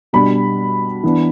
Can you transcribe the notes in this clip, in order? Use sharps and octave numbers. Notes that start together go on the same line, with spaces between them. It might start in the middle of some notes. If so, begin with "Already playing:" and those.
B2 G3 D4 B5
E3 B3 D4